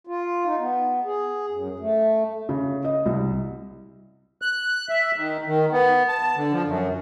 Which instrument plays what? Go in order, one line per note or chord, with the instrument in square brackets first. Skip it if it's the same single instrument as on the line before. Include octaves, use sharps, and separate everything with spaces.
[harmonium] F4
D#4
B3
G#4
F#2
A3
[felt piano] C#3
D#5
C2
[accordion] F#6
E5
D#3
D#3
B3
A5
D3
F3
F#2